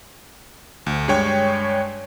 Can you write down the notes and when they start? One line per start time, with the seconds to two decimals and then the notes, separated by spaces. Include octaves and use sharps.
0.86 D2
1.08 G2 G#3 D4 C#5 G5